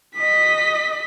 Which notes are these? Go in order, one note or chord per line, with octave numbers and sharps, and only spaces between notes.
D#5 B6